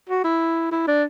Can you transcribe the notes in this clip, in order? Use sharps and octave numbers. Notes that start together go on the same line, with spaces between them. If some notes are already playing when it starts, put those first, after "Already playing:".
F#4
E4
E4
D4